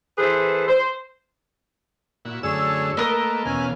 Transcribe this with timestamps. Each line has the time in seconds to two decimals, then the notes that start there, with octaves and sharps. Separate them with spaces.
0.18 E3 G#4 A4 B4 C5
0.68 C5
2.25 A#2 E4 F#4
2.43 F#2 D3 A3 G#4 C#5 E6
2.97 A3 A#3 A#4 B4 D#5
3.45 E2 B2 C#4 F5 G#5